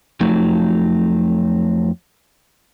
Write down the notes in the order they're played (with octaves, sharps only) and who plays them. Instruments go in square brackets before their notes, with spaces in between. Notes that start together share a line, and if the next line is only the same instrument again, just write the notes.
[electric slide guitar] F2 F3 F#3 A3 D#4